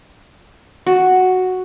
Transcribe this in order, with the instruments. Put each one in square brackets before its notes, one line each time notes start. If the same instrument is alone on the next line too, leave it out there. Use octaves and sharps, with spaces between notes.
[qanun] F#4